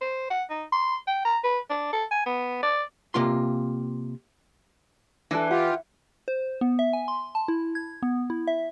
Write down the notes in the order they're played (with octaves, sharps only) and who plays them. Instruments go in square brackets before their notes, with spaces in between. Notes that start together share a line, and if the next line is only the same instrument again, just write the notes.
[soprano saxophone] C5
F#5
D#4
C6
G5
A#5
B4
D4
A4
G#5
B3
D5
[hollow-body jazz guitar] C3 A#3 F4 C6
[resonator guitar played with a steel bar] E3 [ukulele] D4 A4
[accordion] F4 G4 [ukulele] F#5
[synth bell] C5
B3
E5
G#5
C6
A5
E4
G#6
B3
E4
E5